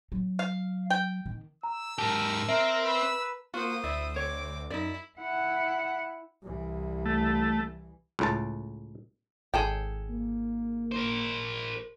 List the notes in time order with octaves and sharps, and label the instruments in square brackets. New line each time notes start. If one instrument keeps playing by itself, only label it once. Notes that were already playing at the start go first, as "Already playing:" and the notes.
[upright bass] F#3
[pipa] F5
G5
[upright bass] D#3
[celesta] A#5 [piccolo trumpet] E6
[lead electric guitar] G#2 G4 [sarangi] A#4 [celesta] A5
[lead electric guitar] C4 [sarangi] A#4 [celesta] E5
[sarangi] B4 [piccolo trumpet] E6
[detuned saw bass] A#3 [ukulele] F4 [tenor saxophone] F#4 [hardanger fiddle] C5 D#6
[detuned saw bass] D2 [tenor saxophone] E4 [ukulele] D5
[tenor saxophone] C4 [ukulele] C#5 [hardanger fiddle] D6
[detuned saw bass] F#2 [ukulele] D#4 D5 [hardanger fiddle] E4
[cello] E4 F#5
[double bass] C2 E3
[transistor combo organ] A3
[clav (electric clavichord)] C#2 A2 A5
[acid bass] G#1 [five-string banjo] G#4 A4 G5
[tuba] A#3
[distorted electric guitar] A#4 C5